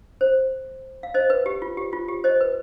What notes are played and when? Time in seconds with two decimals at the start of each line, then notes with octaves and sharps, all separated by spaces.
0.21 C5
1.03 F5
1.14 C5 D#5
1.30 B4
1.46 G4
1.62 F4
1.77 G4
1.93 F4
2.08 G4
2.24 C5 D#5
2.41 B4